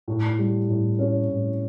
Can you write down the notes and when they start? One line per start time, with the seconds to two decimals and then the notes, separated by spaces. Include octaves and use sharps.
0.08 A2
0.38 G3
0.68 A2
0.99 C#4
1.28 A2